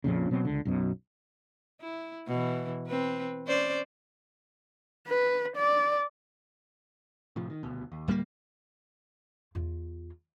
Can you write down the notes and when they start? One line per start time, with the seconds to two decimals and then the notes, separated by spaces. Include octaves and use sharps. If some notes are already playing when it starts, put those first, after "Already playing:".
0.04 A#1 F2 A#2 C#3
0.31 B2 F#3 C4
0.45 C#2 D3
0.65 B1 F#2 B2
1.81 E4
2.27 B2 E3
2.87 C4 B4
3.47 C#4 C5 D5
5.08 B4
5.56 D5
7.36 A2 C3 F3
7.50 D#3
7.63 D#1 D2 B2
7.92 D#2
8.08 D1 G3 A#3
9.55 E2 F4